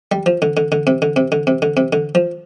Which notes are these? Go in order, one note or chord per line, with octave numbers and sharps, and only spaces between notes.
G3
F3
D3
D3
D3
C3
D3
C3
D3
C3
D3
C3
D3
F3